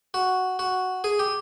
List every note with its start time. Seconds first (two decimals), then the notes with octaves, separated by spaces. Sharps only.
0.14 F#4
0.59 F#4
1.04 G#4
1.19 G4